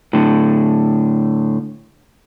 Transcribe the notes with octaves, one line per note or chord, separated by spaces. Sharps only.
A2 D3